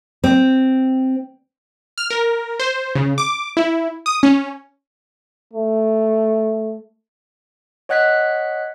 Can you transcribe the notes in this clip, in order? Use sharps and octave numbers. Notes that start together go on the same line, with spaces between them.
C4
F6
A#4
C5
C#3
D6
E4
D#6
C#4
A3
C#5 D#5 F#5 F#6 G#6 B6